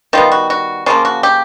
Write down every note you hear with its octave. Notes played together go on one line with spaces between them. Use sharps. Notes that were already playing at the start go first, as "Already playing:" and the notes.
D#3 G3 B3 F4
F#4
F#4
C#3 F3 A#3 F4
F#4
G4